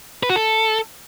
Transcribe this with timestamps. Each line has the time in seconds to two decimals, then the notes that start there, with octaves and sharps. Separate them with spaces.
0.23 B4
0.29 F#4
0.36 A4